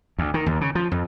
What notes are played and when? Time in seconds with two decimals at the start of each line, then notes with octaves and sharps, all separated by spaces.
0.19 D2
0.34 D#3
0.46 D#2
0.61 C#3
0.75 F3
0.92 F2